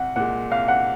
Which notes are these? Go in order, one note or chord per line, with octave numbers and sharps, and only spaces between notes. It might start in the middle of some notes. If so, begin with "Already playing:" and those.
Already playing: C2 F#5
A#2 G#3 F#5
C2 F5
F#5